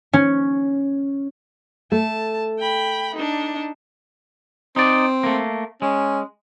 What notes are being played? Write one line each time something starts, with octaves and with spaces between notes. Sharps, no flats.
C#4
A3 A5
G5 B5
D4 D#4
C4 D#4 D5
A3 A#3
G#3 C#4